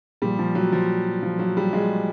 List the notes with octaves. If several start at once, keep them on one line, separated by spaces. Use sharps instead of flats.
A#2 F3 G3
F3
F#3
F3
F3
F#3
G3
G#3